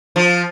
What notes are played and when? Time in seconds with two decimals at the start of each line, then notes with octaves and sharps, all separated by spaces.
0.16 F3